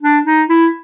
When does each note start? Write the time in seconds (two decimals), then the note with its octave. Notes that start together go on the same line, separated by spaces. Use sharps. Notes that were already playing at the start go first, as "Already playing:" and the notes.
0.01 D4
0.26 D#4
0.49 E4